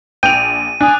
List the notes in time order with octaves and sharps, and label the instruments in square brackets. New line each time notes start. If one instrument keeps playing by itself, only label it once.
[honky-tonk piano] A#1 D7 F7 [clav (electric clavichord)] G5 [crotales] D#7
[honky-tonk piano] D4 [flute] G#5 [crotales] D#6 F#6